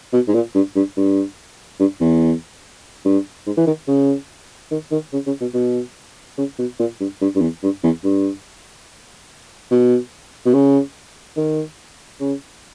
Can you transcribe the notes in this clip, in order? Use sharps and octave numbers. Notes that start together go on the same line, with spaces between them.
B2
G#2
A#2
G2
G2
G2
G2
E2
G2
G#2
E3
D#3
C#3
D#3
D#3
C#3
C#3
B2
B2
C#3
B2
A#2
G2
G2
G2
E2
G2
E2
G2
B2
B2
C#3
D#3
C#3